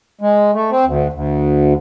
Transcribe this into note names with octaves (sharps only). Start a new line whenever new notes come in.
G#3
A3
C4
D2
D2